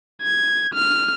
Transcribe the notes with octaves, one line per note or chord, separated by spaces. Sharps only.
G#6
F6